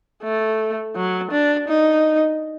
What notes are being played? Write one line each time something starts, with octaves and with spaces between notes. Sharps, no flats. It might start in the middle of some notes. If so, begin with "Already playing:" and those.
A3
F#3
D4
D#4